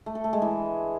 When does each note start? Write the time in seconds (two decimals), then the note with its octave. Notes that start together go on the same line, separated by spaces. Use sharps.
0.06 A3
0.15 A4
0.24 A3
0.33 G#3
0.42 E3